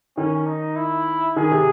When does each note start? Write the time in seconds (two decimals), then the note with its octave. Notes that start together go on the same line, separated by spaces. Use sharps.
0.17 D#3 C#4
0.46 D#4
0.76 E4
1.36 D#3 G#4
1.51 C3